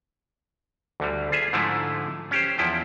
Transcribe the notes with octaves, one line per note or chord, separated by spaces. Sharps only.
D2 D3 G3
F4 G#4 E5
G#2 D3 F3 A3 E4
C#4 G4 C5
E2 F3 E4 G5